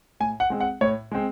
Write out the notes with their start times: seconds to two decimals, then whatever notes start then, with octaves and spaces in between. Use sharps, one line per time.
0.20 A2 G#5
0.40 F#5
0.50 G#3 C4
0.60 F#5
0.81 A2 C#5
1.12 G#3 C4